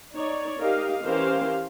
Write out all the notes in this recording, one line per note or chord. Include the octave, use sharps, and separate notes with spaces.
D#4 C#5 D5
D#4 G4 A#4 D#5 F5
E3 C#4 G4 A#4 C5 F5